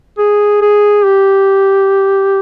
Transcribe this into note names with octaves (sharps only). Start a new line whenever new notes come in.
G#4
G#4
G4